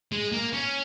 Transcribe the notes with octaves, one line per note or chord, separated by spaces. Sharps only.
G#3
A#3
C#4